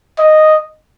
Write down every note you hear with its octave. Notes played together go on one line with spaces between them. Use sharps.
D#5